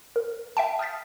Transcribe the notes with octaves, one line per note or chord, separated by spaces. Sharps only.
A#4
E5 G5 A5
D#6 F6 G6 A6 B6